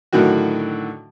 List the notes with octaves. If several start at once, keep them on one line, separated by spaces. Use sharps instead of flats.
A2 D3 D#3 F#3 F#4